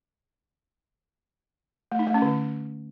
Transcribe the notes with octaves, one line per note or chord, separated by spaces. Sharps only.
A3
D#4
A3
C#4
D3